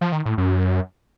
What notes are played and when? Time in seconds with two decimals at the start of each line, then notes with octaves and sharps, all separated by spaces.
0.01 F3
0.12 D#3
0.25 A2
0.38 F#2